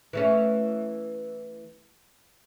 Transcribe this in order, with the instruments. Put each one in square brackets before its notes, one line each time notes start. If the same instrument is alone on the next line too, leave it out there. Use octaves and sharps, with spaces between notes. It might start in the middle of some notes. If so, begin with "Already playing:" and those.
[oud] E3 A3 C#4